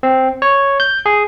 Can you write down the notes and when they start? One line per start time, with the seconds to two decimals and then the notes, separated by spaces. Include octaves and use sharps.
0.03 C4
0.42 C#5
0.80 G6
1.06 G#4